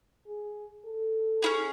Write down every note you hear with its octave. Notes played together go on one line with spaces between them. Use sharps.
G#4
A4
C#4 E4 G#4